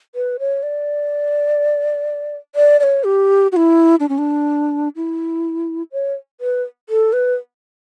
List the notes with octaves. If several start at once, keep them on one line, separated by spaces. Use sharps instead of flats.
B4
C#5
D5
D5
D5
C#5
G4
F#4
E4
D4
C#4
D4
E4
C#5
B4
A4
B4